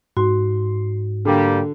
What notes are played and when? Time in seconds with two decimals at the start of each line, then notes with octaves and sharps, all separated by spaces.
0.17 G#2 F#4 C6
1.25 D3 G3 A#3 G4